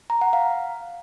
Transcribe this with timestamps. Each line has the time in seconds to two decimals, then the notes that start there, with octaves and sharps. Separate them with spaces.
0.10 A#5
0.21 F#5
0.33 F5